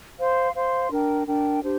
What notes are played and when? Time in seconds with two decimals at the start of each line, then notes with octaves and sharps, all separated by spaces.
0.18 C5 F5 C6
0.54 C5 F5 C6
0.91 D4 A#4 G5
1.27 D4 A#4 G5
1.63 D4 G4 C5